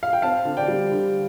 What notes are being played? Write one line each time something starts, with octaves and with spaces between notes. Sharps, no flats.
F5
G5
C4 F5 A5
D3
D5 G5
G3
D3